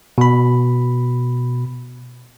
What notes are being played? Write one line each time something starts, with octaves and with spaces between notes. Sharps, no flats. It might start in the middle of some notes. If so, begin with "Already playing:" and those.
B2 B5